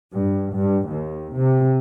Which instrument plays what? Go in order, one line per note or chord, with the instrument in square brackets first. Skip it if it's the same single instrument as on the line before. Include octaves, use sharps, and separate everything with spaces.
[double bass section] G2
G2
D#2
C3